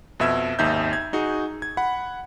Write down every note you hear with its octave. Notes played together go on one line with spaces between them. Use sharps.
F2 B2 E5 E6 G#6
G#1 D#2 D#4 E5 G6
G#6
D#4 F#4 G#4
G#6
F#5 B5